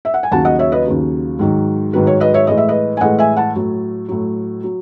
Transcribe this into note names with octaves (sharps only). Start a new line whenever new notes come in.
E5
F#5
G#5
D#2 C#3 F#3 F#5 A5
D#5 F#5
C#5 E5
B4 D#5
D#2 C#3 F#3
G#2 D#3 F#3
G#2 D#3 F#3 B4
C#5
B4 D#5
C#5 E5
A2 E3 G#3 D#5
E5
B4 D#5
G#5
A2 E3 G#3 D#5 F#5
E5 G#5
F#5 A5
A2 F#3
A2 F#3
F#3